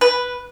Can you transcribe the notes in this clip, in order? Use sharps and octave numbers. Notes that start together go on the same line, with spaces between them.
B4